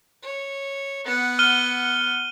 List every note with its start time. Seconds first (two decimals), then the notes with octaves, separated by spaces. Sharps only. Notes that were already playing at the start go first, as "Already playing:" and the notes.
0.23 C#5
1.05 B3 F#5
1.39 F6 D#7 G7